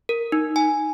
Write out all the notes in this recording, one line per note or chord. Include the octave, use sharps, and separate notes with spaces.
A#4
D#4
G#5